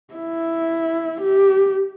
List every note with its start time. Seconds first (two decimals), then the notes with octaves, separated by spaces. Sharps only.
0.14 E4
1.21 G4